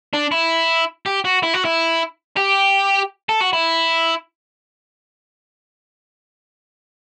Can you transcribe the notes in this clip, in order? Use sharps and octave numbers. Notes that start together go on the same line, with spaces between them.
D4
E4
G4
F#4
E4
F#4
E4
G4
A4
F#4
E4